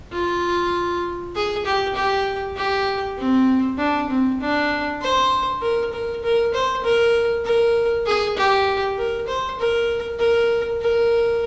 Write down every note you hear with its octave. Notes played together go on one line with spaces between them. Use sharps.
F4
G#4
G4
G4
G4
C4
D4
C4
D4
C5
A#4
A#4
A#4
C5
A#4
A#4
G#4
G4
A#4
C5
A#4
A#4
A#4